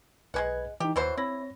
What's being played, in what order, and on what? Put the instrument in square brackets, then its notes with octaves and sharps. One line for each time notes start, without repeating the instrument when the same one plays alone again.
[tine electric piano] B1 B4 G#6 [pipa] G#3 C#4 F#5
[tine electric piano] E3 D#4 [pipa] G4
[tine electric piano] D#2 [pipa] E3 F#3 C5
[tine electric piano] C4 C#5 A#6 [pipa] E4